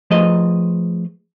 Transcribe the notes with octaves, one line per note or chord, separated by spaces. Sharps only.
F3 A3 F4 G#4 B4 D#5